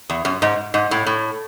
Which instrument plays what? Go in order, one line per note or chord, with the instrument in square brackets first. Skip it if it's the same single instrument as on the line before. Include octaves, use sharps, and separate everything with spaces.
[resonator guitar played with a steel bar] E2
F#2
G#2
G#2
A2
A2